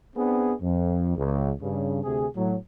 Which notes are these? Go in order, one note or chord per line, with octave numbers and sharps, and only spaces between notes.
B3 C4 D4 G#4
F2
C#2
G2 C#3
D2 C3 G#4
A2 F#3